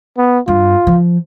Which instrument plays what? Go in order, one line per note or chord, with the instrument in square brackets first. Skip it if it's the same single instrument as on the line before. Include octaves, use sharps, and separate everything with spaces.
[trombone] B3
[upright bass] G2 [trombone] F4
[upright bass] F3